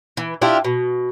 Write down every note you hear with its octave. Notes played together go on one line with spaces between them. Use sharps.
E3
D4 E4 F4 G4
B2